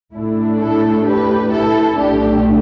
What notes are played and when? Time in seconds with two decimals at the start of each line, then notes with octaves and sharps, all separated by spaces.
0.13 A2 A3 D4 E4
0.60 E4 A4
1.06 G4 B4
1.52 E4 A4
1.98 B1 A2 A3 D4 G4